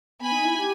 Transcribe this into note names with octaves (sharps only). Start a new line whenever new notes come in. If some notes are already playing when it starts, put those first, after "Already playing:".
B3 G#5 B5
D#4
E4
G4